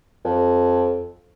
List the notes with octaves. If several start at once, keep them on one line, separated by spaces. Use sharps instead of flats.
F2